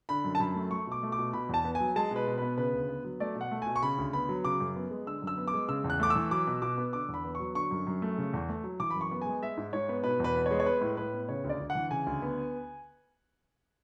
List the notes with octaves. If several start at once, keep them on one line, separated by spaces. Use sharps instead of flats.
D3 B5
F#2
A5
F#2 B5
A3
A3 C#6
B2 D6
A3
D6
B2
B2 B5
E2 A5
B3
G#5
F#3
G#3 A5
B2 B4
B2
B3 B4
C#3 B4
D2
B3
F#3
A3 D5
B2
F#5
A3
B2 G#5
C#6
C#3 B5
D2
B3 B5
F#3
C#3 D6
F#2
B3
G#3
D3 E6
F#2
E6
B3
D6
G#3
C#3 E6
E2
F#6
A3 D6
E6
E3
F#3 D6
B2
B2 D6
B3
D3 D6
E2
B5
B3
C#6
F#3
D3 C#6
F#2
F#2
A3
C#3
E2
A3
F#3
E3 D6
F#2 B5
C#6
B3
G#3 G#5
G#3 E5
G#2
G#2 C#5
B3
B2 B4
E2 B4
B3
C#5
G#3
C#5
G#3 B4
A2
A2 B4
B3
C#3 C#5
D2
D5
D2
F#5
E3
C#3 G#5
D2
B3